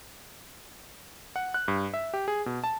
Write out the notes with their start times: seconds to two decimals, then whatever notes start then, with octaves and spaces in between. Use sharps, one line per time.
1.36 F#5
1.54 F#6
1.68 G2
1.94 E5
2.14 G4
2.28 G#4
2.46 B2
2.64 A5